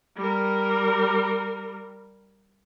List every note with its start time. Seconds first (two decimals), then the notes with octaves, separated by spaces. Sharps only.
0.17 G3 A#4